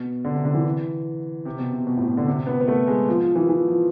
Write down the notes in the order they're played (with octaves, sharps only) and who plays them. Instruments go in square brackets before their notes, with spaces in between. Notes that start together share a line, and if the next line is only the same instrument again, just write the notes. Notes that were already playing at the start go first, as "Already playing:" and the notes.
Already playing: [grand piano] B2
D3
C3
D3
E3
C3
B2
C3
B2
A2
B2
D3
C3
B3
B3
A3
G#3
F3
F3
E3
E3
F3